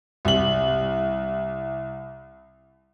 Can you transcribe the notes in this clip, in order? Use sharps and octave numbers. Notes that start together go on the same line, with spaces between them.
C2 F#7